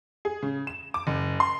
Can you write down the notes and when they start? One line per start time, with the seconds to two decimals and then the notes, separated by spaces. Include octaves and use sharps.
0.25 G#4
0.43 C#3
0.67 E7
0.94 D6
1.07 F#1
1.40 C6